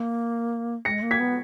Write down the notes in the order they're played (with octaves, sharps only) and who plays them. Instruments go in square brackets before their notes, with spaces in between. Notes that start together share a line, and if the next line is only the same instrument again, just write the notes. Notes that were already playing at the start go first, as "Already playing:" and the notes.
Already playing: [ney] A#3
[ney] G#3 [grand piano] A#6 C#7
[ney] A#3
[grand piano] G#6 B6
[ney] B3